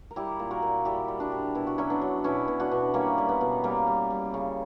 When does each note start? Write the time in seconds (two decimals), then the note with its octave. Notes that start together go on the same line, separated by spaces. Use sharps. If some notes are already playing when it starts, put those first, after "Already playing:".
0.11 A#4
0.16 G3 E4 G4
0.39 A#2
0.51 F#4 A#4
0.62 A#2
0.85 G3 E4 G4
1.08 G3
1.20 D4 F#4
1.32 G3
1.55 B2 E4
1.67 F#4
1.78 F#3 C#4 E4
1.90 B3 D4
2.02 F#3
2.24 B2 C#4 E4
2.48 B2
2.60 D4 F#4
2.72 B2
2.94 G3 A#3 C#4
3.18 G3
3.29 B3
3.41 B2
3.64 G3 A#3
3.87 G3
4.11 G3
4.34 C#3